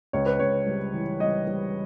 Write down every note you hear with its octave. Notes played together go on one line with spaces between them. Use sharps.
C#2 C#5
B4
C#2 C#5
G3
E3
G3 D#5
G3